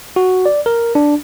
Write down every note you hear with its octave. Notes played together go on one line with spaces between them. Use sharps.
F#4
D5
A#4
D4